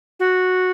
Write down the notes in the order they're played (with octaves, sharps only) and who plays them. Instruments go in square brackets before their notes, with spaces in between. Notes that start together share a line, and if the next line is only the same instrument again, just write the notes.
[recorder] F#4